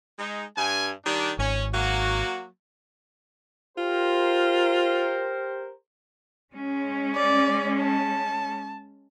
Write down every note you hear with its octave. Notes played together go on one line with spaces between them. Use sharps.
G#3 D#4
G2 G#5
D#3 G3 D4
G#1 C#4
F#3 A#3 F#4
F4 G4 A#4 C5
G#3 C#4
D5
A5